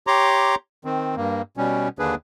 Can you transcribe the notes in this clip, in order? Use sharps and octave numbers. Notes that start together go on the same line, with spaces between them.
G4 C#5 A#5 C6 D6
D#3 C4
G2 A#3
B2 G3 C#4
D#2 D3 A#3 D4 G#4 B4